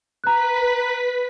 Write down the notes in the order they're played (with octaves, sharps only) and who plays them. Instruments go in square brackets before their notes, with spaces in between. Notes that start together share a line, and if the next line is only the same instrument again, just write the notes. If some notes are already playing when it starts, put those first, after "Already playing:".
[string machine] B4 B6 [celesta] A#5 F#6